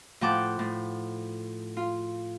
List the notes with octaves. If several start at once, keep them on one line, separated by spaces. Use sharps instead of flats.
A2 F3 F#5 G5 A5 D6
A2
F4